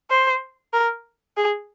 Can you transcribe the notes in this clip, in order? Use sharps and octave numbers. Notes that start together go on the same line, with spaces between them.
C5
A#4
G#4